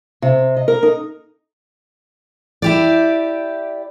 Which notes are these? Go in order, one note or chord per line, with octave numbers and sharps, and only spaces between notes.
C3
D#5
A#4
D#4
E4 G4 D5